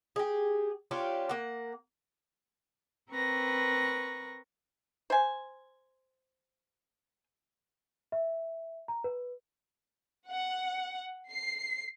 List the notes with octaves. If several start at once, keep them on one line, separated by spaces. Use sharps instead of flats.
G4 G#4
C#4 D4 F4 G4
A#3 F#5
C4 A#4 B4 C#6 A#6
C5 G#5
E5
A#5
B4
F#5
C7